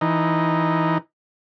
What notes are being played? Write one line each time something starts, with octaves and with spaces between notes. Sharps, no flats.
E3 D#4